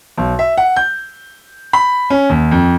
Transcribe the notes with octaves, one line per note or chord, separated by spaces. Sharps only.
B1
E5
F#5
G6
B5
C#4
D#2
F2